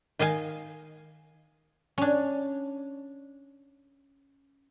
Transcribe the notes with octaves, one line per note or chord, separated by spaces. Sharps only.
D#3 D#5 F5 G#5
C#4 D4